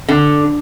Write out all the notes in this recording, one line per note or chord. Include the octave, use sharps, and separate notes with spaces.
D3